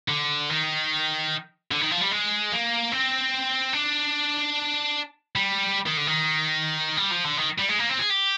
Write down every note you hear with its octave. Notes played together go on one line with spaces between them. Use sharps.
D3
D#3
D3
D#3
F3
G3
G#3
A#3
C4
D4
G3
D#3
D3
D#3
G3
F3
D3
D#3
G3
G#3
A#3
C4
G#4
G4